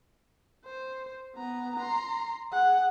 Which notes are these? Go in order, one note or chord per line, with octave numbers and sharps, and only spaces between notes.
C5
B3 A#5
A#5 C6
G#4 F#5